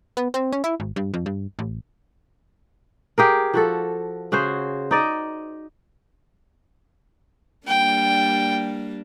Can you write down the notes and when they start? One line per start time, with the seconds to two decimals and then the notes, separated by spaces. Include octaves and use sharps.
0.17 B3
0.34 C4
0.53 C#4
0.64 E4
0.80 G#1
0.96 G2
1.14 F2
1.26 G2
1.59 A1
3.18 G4 G#4 A#4
3.54 F3 F#4 A4
4.32 C#3 F#4 G#4 C5
4.91 D#4 D5 D#5
7.67 G3 A#3 D4 G5